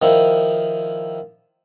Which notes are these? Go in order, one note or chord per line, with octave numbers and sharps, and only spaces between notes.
D#3 F3 E4